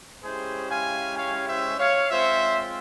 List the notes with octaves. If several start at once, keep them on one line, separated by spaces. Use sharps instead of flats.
G#3 C#4 E4 G4 G#4 C5
F5 G#5
C#5 F5
C5 E5
C#5 F5
G#3 C4 F4 C5 E5